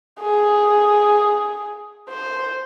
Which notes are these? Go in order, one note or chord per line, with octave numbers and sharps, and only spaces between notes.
G#4
C5